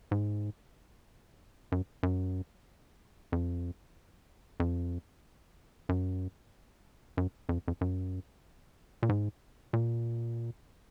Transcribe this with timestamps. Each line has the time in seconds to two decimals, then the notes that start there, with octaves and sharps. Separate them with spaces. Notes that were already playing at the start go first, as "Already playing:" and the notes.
0.11 G#2
1.72 F#2
2.03 F#2
3.32 F2
4.60 F2
5.89 F#2
7.17 F#2
7.49 F2
7.68 F2
7.81 F#2
9.03 A#2
9.09 G#2
9.73 A#2